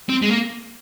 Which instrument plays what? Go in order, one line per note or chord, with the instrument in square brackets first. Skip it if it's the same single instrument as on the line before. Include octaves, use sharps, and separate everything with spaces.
[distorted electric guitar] C4
G#3
A#3